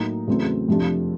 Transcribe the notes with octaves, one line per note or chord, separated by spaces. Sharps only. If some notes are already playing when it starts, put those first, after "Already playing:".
Already playing: A2 F#3 A#3 D#4
E2 C#3 F#3 A3 C4
F2 C3 F3 A3 D4